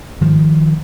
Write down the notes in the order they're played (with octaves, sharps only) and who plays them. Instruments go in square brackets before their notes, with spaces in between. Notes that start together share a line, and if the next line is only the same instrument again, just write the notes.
[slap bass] G#2 D#3 F3